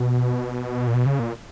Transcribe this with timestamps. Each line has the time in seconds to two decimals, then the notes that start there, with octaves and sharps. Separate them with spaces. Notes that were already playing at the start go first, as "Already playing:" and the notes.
Already playing: B2
0.87 A#2
0.94 B2
1.06 C#3
1.19 A#2